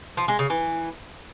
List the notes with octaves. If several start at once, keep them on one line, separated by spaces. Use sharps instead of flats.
F3
G#3
C#3
E3